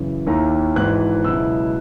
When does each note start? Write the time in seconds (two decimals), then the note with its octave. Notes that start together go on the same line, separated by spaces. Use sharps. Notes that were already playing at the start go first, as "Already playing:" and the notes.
Already playing: F#2 C#3 E3
0.26 D#2 D#3 A#3 E4 A#5
0.76 G#1 G#2 E3 F#6
1.24 C#2 B2 F#3 B3 E4 E6